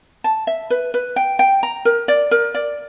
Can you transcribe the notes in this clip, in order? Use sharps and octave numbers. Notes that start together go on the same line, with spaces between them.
A5
E5
B4
B4
G5
G5
A#5
A#4
D5
A#4
D5